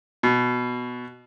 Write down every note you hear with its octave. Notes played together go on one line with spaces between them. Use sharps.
B2